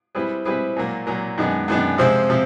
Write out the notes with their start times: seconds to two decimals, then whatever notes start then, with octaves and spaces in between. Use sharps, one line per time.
0.15 G3 C4 E4 G#4 B4
0.45 G3 C4 E4 G#4 B4
0.76 A#2 F#3 A#3
1.07 A#2 F#3 A#3
1.38 F#2 D#3 G#3 B3 D4
1.68 F#2 D#3 G#3 B3 D4
1.98 C3 F3 G#3 C4
2.30 C3 F3